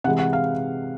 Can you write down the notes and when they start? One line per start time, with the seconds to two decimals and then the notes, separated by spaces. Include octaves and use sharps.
0.04 C3 E3 G#3 F#5
0.19 F#5
0.33 F5